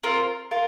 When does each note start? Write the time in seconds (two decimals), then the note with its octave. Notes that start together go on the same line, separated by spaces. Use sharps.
0.03 C4 F4 A#4
0.51 F4 A#4